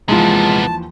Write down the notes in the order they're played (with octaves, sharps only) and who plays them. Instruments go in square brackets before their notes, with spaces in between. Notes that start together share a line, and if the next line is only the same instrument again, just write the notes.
[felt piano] D#2 E3 F3 [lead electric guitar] C3 B3 [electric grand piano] G#3 F4 [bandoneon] A5